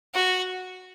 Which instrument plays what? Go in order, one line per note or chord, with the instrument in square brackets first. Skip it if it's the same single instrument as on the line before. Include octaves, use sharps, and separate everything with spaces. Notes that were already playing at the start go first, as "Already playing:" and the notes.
[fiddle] F#4